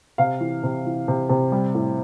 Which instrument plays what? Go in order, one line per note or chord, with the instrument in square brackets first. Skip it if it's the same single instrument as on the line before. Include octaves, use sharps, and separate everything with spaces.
[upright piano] C3 F5
E3
C3
E3
C3
C3
G3
A2